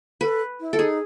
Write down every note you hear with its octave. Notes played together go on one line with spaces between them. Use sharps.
A4 B4
E4
A4
D#4 G#4